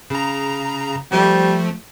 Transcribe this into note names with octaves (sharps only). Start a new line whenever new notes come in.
C#3 A#5
F3 G3 A3